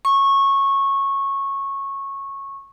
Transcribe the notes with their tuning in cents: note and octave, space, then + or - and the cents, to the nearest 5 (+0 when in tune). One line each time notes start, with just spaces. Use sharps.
C#6 -15